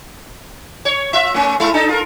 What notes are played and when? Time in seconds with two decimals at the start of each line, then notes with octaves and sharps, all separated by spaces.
0.85 C#5
1.13 F4 E5
1.34 A3 C#4
1.60 G#3 A3 E4
1.74 D4 D#4 A4
1.89 F4 A#4